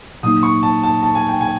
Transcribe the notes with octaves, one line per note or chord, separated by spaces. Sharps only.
A#2 F#3 A#3 D#4 D#6
C#6
A5
A5
A5
G#5
G5
G#5